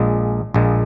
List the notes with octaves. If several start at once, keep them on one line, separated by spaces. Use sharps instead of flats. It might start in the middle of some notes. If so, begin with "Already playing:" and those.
Already playing: A#1 A#2 G#3
A#1 A#2 G#3